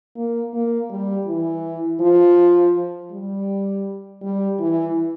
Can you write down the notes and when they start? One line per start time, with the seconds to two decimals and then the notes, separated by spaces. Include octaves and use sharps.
0.16 A#3
0.53 A#3
0.90 G3
1.26 E3
2.01 F3
3.11 G3
4.22 G3
4.59 E3